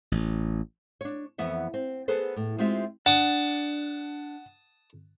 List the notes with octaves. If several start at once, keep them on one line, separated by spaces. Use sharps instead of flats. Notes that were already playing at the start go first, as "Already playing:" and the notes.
A1
D4 C#5
F2 E3 B3 E5 F#5
C4
B3 G#4 A4 B4 C5
A2
G#3 C4 D#4 F4 G4 E5
D4 F#5 A5 D#6